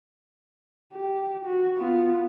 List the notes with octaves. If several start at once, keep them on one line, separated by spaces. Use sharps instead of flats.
G4
F#4
B3 F4